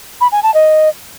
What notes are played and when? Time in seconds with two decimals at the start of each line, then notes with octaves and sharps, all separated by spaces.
0.21 B5
0.32 G#5
0.43 A5
0.54 D#5